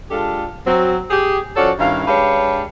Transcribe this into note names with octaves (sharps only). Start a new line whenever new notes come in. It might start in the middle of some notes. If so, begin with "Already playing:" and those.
G#3 D4 F4 G4 A4
F#3 C4
G4 G#4
F3 C#4 F#4 A4 C#5 D5
G2 D#3 C#4 E4 F5
G#3 D4 G4 B4 C#5 F5